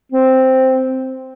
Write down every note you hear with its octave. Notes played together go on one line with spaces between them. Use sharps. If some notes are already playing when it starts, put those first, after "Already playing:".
C4